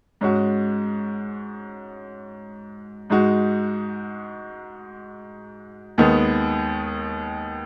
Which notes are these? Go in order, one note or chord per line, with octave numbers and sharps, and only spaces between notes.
G#2 G#3 C#4 F#4
G#2 G#3 D#4 F#4
D#2 D#3 G#3 B3